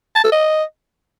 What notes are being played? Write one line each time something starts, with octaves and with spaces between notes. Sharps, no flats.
A5
A4
D#5